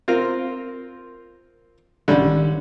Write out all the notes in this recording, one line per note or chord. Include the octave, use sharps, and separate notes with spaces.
C4 F4 A#4
A1 D3 D#3 G3 C#4